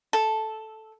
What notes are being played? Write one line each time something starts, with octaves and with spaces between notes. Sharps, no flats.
A4